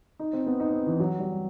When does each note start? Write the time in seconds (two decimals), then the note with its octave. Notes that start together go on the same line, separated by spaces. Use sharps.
0.19 D#4
0.33 C4
0.46 B3
0.60 D#4
0.72 C4
0.87 E3
1.00 F#3
1.19 G3